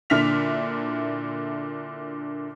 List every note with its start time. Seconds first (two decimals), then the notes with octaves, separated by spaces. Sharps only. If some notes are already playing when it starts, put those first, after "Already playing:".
0.10 A#2 D3 E4 F6 B6 F7